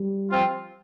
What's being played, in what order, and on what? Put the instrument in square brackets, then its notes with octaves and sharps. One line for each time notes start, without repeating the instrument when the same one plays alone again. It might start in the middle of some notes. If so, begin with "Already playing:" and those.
Already playing: [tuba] G3
[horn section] F3 C4 F4